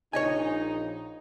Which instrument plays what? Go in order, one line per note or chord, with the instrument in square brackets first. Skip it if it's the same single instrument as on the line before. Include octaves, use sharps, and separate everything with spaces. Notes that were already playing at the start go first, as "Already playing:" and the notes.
[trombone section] A#1 D#4 [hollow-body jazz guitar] C#5 D#5 G#5